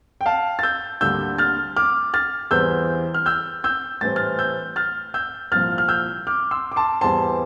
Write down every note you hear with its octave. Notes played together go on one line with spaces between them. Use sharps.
G5
F5 A5
A6
E6 G6
D2 D3 G3 A#3 E6 G6
F6 A6
D6 F6
F6 A6
E2 E3 G3 C4 E6 G6
F6
E6 G6
E6 G6
A2 E3 G3 C4 A6
F6 A6
E6 G6
F6 A6
E6 G6
C2 A#2 F3 F6 A6
F6
E6 G6
D6 F6
C6 E6
D6
A5 C6
E2 E3 G3 C4 A5 C6